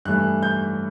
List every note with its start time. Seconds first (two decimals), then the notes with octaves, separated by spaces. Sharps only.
0.05 G2 E3 A3 F#6
0.43 G6